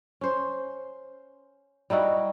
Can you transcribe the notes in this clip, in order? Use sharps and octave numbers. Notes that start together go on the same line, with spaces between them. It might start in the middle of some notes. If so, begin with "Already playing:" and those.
C#4 C5
G3 D#4 E4 F#4